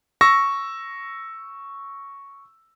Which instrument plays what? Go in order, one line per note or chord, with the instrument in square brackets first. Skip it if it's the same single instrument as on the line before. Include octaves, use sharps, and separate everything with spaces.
[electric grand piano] C#6 E6 A#6